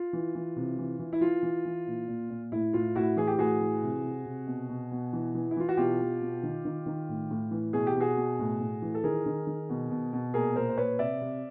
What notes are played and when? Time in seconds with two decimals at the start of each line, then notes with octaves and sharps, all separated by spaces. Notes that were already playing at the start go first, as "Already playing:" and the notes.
Already playing: F4
0.13 E3
0.35 E3
0.56 C3
0.78 E3
0.99 E3
1.13 E4
1.21 E3 F4
1.43 E3
1.65 E3
1.87 A#2
2.08 A#2
2.30 A#2
2.52 A2 E4
2.73 A2 F4
2.95 A2 E4 F#4
3.16 E3 G#4
3.27 G4
3.38 A2 F#4 G#4
3.60 E3
3.83 C3
4.04 C3
4.26 C3
4.47 B2
4.69 B2
4.91 B2
5.13 E3
5.35 E3
5.51 E4
5.57 E3 F4
5.69 F#4
5.77 B2 F4 G4
6.00 B2
6.21 B2
6.43 D#3
6.65 D#3
6.86 D#3
7.09 A2
7.30 A2
7.51 E3
7.73 B2 G#4
7.87 G4
7.95 B2
8.00 F#4 G#4
8.16 B2
8.39 A2
8.60 A2
8.82 E3
8.95 A4
9.04 D#3 G#4 A#4
9.26 D#3
9.47 D#3
9.70 B2
9.90 B2
10.13 B2
10.34 A#2 G#4 A#4
10.55 A#2 A#4 C5
10.69 C5
10.78 A#2 B4 C#5
10.99 C3 D5 E5
11.21 C3